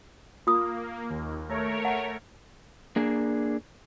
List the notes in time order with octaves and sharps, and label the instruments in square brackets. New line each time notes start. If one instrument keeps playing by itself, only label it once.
[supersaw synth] A#3 [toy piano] F4 D#6
[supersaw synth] D#2
A3 A#4 C#5
[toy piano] F#5
[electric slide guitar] A#3 D4 G#4